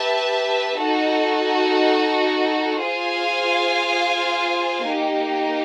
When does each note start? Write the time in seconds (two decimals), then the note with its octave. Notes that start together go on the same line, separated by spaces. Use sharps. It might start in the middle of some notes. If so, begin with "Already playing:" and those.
Already playing: G4 B4 E5 A5
0.81 D#4 F#4 A4
2.84 F4 G#4 C5 F5 G#5
4.87 A#3 D#4 G4